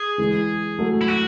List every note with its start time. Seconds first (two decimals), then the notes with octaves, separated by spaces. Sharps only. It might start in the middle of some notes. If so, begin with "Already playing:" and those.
Already playing: G#4
0.18 E3 G#3
0.78 F#3 A3
1.01 E4
1.08 F#4